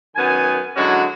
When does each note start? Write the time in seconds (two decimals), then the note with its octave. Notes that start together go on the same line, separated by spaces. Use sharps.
0.16 F#2 D#3 B3 G#5
0.76 D3 F#3 G#3 C#4 E4 F#4